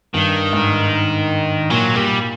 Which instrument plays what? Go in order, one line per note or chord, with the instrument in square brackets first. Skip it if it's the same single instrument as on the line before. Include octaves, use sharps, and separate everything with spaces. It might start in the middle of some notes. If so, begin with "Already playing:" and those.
[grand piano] G2 [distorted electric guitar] D#3
[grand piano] G#2
[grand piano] A#2 [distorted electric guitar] F#3
[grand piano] A#2 [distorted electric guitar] G3